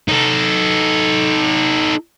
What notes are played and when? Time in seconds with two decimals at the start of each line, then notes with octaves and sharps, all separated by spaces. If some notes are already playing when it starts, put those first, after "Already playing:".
0.08 D#4 A4